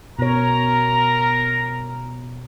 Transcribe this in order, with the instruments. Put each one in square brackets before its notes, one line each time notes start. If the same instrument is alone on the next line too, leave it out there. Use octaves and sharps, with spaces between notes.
[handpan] B2 C#5 [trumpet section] A#4 A#5